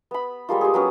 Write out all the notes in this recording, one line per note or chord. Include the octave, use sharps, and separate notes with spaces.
B3 B5
G3 G#3 A#3 F4
G4 G#4
F#3 B3 C#4